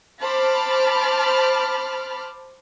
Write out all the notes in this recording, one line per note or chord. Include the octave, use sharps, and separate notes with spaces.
C5 A5 B5 D6 F6